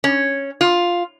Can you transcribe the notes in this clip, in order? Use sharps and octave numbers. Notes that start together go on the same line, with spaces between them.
C#4
F4